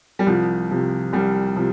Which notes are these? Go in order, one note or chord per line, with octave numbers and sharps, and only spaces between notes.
G3
C2 F3
C3 F3
C2 G3
C3 F3